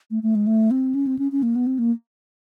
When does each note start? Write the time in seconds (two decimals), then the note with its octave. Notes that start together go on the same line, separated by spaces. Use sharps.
0.11 A3
0.23 A3
0.35 G#3
0.47 A3
0.71 C4
0.95 C#4
1.07 C4
1.19 C#4
1.32 C#4
1.43 A#3
1.56 B3
1.67 C4
1.79 A#3